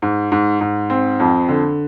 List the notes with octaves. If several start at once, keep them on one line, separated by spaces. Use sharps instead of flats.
G#2
G#2
G#2
C4
F2
D3